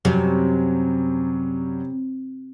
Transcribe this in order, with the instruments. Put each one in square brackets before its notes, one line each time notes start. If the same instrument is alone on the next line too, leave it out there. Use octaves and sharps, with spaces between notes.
[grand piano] F#2 F#3 G3 [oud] C3